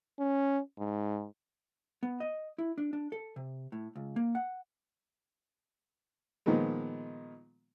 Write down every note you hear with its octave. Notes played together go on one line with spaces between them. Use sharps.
C#4
G#2
B3
D#5
E4
D4
D4
A4
C3
A2
C#2
A#3
F#5
A#2 D#3 F3 G#3 B3